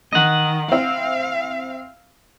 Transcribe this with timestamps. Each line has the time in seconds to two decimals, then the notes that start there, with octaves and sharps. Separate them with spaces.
0.13 D#3 D#5 F#5
0.72 C4 E4 F5